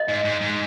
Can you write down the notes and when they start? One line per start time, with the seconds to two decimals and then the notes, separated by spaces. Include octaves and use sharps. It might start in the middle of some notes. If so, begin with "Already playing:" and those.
Already playing: D#5
0.09 G#2
0.25 G#2
0.41 G#2